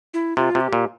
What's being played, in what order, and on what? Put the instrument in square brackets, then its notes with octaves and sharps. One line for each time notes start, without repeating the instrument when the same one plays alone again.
[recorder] E4
[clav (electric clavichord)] C3 [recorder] F4
[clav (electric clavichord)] C3
[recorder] G4
[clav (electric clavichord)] A#2